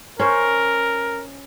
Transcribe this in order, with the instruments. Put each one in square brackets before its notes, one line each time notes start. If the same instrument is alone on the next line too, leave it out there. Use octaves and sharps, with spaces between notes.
[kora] C#4 C5 C#5 [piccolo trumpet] A#4